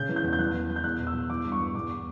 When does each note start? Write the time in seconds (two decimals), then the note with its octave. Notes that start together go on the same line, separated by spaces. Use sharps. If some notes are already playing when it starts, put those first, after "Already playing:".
Already playing: C#3 G6
0.09 E3
0.16 G6
0.24 E2
0.33 G6
0.39 E3 F#6
0.54 E3
0.69 E3
0.76 G6
0.84 E2 F#6
0.99 E2
1.07 E6
1.14 E2
1.30 E3 D6
1.45 G2
1.52 C#6
1.60 E3
1.75 E2 D6